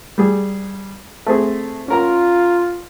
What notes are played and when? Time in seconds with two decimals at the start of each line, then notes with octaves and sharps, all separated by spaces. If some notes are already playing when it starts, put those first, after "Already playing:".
0.18 G3 G#4
1.26 A3 C4 G#4
1.88 C#4 F4 A#4 A#5